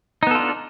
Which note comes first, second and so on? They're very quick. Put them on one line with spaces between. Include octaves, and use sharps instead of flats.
D#4 B3 A4 F4 D4